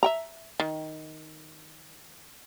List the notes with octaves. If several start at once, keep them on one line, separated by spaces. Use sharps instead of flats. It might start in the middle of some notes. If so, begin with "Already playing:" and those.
E5 G5 A#5
D#3